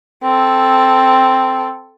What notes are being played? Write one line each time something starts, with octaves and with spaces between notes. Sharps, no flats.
C4 A4